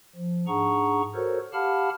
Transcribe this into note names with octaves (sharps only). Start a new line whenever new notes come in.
F3
G#2 D4 G#4 F#5 A#5 C#6
F#4 A4 A#4 C5 C#5
G4 F5 F#5 A5 B5 F6